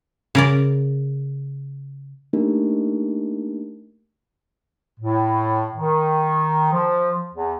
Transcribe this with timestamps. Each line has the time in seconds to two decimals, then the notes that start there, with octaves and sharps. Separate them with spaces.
0.35 C#3 A#4 D5
2.33 A3 A#3 D4 D#4 G4 A#4
5.00 A2
5.75 D#3
6.73 F3
7.33 E2